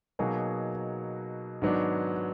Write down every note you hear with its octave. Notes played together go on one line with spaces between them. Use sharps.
B2 F#3 A#3 D#4 G#4
G#2 D#3 F#3 B3 D4